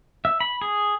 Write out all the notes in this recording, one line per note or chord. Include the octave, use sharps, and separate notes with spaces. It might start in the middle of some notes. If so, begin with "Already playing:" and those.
E5
B5
G#4